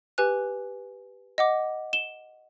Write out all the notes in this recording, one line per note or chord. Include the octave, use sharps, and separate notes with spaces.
G4 B4 G#5 F#6
D#5 F#5 D6
E7 G7